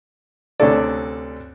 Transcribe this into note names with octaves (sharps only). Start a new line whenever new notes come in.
D2 C3 C#4 D4 A4 D5